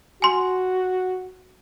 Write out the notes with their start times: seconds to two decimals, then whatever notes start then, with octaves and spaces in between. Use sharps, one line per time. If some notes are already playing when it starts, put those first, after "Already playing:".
0.22 F#4 G#5 C6